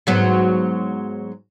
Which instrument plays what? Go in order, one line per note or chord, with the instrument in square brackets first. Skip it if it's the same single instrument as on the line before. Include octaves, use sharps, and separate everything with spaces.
[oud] G#2 F#3 B3